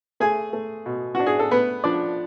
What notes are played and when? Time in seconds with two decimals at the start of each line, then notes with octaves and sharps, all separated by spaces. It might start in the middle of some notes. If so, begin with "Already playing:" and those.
0.20 A3 G#4 G#5
0.53 A3
0.86 B2
1.15 D4 F#4
1.26 G#4
1.39 A4
1.51 A3 B3 B4
1.84 F3 D4 D5